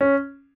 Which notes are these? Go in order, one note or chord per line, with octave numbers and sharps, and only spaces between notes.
C#4